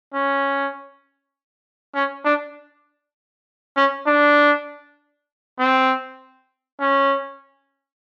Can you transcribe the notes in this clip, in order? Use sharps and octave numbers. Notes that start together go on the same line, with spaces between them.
C#4
C#4
D4
C#4
D4
C4
C#4